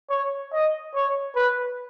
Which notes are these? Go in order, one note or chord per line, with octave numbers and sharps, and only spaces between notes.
C#5
D#5
C#5
B4